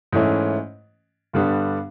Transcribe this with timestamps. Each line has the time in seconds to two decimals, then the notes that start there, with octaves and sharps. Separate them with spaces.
0.12 G#2 E3 A3 C#4
1.33 G2 D3 G3 B3 D4